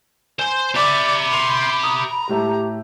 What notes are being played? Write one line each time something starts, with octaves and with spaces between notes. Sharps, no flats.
C5 G#5 C6
G4 D5 E5 B5
C6 D#7 F7
A#5 D#6
A2 A3 G4 E5